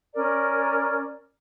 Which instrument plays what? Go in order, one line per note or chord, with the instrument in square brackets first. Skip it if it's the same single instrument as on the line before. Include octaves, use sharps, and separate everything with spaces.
[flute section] C#4 A#4 D5